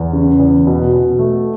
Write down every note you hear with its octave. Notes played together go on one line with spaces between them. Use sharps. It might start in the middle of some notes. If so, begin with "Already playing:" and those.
Already playing: E2
C#3
E2
B2
B2
A3